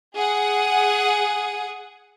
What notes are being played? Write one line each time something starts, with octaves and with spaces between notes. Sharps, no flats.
G#4 F#5